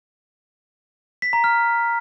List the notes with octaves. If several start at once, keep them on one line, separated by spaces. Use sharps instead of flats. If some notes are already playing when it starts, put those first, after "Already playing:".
B6
A#5
F6